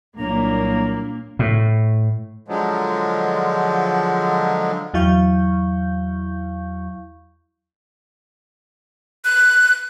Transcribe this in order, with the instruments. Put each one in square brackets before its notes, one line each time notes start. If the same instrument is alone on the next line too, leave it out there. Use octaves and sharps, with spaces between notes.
[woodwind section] C2 F#3 A#5 [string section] A#2 A#3 [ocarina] D4
[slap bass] A2
[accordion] D3 F3 F#3 G#3
[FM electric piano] E2 F#3 E4 F5 C#6 G6
[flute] F#6